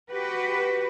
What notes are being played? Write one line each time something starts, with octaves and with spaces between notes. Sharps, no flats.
F#4 G4 B4